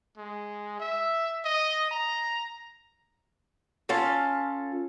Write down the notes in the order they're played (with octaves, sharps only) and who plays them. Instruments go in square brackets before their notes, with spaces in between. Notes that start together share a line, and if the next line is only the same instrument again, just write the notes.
[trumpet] G#3
E5
D#5
A#5
[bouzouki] C#4 F4 A4 F5